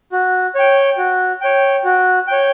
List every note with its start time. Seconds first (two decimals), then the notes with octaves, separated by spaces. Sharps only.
0.12 F#4
0.55 C#5 G5
0.98 F#4
1.41 C#5 G5
1.84 F#4
2.28 C#5 G5